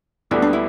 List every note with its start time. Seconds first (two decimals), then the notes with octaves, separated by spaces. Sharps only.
0.31 D2 D3 G3 B3 E4
0.42 D4
0.53 E4